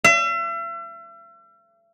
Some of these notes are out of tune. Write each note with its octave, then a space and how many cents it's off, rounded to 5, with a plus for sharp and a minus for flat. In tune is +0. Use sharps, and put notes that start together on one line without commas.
E5 +40